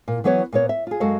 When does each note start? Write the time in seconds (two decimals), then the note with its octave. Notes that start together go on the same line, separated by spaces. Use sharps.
0.08 A#2
0.24 E3 F#3 B3 B4 C#5
0.52 A#2 B3 C#5
0.69 E5
0.87 F4 G#4
1.00 F#2 G#3 F#4 A4 D#5 F5